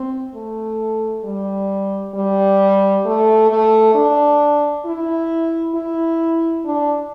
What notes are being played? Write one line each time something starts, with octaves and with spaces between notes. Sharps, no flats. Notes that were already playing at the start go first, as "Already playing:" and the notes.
Already playing: C4
A3
G3
G3
A3
A3
D4
E4
E4
D4